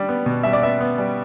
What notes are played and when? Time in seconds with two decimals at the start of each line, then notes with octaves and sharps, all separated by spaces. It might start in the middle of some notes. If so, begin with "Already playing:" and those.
Already playing: G3 D4
0.09 B3
0.26 B2
0.43 G3 E5
0.53 D5
0.62 B3 E5
0.80 B3
0.98 G3